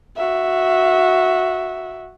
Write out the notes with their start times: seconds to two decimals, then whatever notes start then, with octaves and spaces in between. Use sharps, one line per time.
0.16 F#4 E5